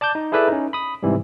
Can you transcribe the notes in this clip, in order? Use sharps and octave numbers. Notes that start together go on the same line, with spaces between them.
D5 A5 D6 G6
D#4
E4 G#4 A4 B4 D5 E5
C#4 D#4
B5 D#6
G#2 C3 E3 G3